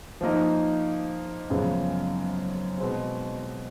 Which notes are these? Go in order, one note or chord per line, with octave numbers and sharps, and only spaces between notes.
F3 A#3 D#4
F#2 C#3 F3 G#3 B3
B2 G#3 C4